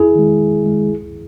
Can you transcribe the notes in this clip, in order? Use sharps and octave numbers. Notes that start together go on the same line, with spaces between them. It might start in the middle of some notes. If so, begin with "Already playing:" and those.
Already playing: E2 E4 G#4
D#3 G#3
E2
D#3 G#3
C#2